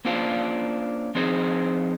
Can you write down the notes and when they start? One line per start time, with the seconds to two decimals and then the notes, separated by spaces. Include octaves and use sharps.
0.05 A#3 C#4 D4 F4 C5 F5
1.15 F3 C4 D#4 G#4 C5